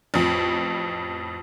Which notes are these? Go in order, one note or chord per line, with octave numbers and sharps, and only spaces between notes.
A1 F2